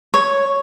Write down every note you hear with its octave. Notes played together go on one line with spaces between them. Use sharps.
C#5